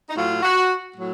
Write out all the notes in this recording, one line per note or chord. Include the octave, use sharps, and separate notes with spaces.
D#4
A2 F#3 F4
F#4
A2 F#3